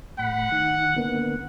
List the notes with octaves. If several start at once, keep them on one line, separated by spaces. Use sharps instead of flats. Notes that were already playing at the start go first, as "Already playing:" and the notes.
A2 F#5 B5
D#3
D3 A#3 B3